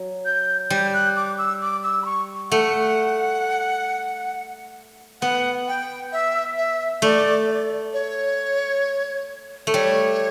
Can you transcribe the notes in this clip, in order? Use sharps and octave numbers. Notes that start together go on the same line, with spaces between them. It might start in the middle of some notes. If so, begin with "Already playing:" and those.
Already playing: F#3
G6
G3 G6
F#6
D6
E6
D6
E6
B5
C#6
A3 F#5
B3 F#5
G5
E5
E5
A3 D5
D5
C#5
A3
G3 C#5